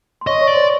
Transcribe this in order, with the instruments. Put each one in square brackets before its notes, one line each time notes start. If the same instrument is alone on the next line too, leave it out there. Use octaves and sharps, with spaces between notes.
[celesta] C6
[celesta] C#5 C#6 [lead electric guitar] D#5
[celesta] C#5 C#6
[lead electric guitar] D5
[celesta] C5 C6